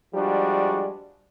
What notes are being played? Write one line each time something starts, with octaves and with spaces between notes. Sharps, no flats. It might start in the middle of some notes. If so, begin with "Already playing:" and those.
F3 G3 G#3 D4 F#4